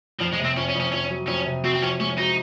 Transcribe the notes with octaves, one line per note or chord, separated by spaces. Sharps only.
F2 F3
G#3
C3
C4
F2 C#4
C#4
F2
C#4
F2 C#4
F#3
F2 C#4
C3
C4 F#4
C4
F3 C#4
G#3 C#4
D#4 F#4